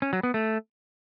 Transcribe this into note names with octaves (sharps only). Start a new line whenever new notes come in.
C#4
F#3
B3
A3